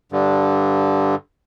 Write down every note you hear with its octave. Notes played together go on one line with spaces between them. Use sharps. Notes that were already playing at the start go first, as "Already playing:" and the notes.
G2 D3